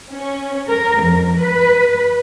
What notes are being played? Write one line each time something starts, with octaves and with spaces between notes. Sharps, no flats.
C#4
A#4
F2
B4